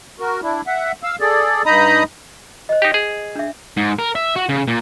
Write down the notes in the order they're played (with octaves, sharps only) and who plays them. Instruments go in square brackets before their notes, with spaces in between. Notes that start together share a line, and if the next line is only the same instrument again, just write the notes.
[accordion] F#4 A#4
D4 E4
E5 F#5
F5 E6
G#4 A4 D5
G2 D#4 D#5 A#5 B5 D#6
[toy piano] C5 D#5
[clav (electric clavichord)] D#4 G4
G#4
[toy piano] D4 E5
[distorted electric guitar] G#2
A#4
E5
F#4
C#3
A#2